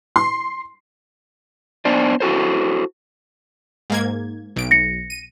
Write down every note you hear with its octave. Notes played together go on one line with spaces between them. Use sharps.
C6
B3 D4 C5 D5
E4 F#4 A4 C5
G#2 A#3 G#6
B1 D7
A#6 C#7
D#7